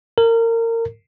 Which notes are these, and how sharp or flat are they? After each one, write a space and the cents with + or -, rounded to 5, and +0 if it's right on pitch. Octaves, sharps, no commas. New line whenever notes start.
A#4 -25